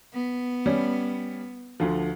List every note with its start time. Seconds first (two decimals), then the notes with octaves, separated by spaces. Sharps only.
0.14 B3
0.66 G3 C#4
1.80 D2 D3 F3